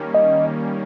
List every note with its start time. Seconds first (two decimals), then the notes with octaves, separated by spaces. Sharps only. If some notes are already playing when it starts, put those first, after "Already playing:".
Already playing: D#3 G3 A#3 C#4
0.15 D#5